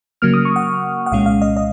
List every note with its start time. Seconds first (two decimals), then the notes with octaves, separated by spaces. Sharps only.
0.22 C#3 F#3 A#3 F6
0.34 D#6
0.45 C#6
0.56 F#5
1.06 F#5
1.12 C2 A#2 G#3 C#4 F5
1.26 F5
1.42 D#5
1.57 D#5